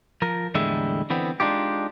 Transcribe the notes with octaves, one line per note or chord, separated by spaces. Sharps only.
F3 A#4
E2 A2 D3 G3 G#3 E5
D3 E3 B3 C4
G#3 D4 D#4 F4 G4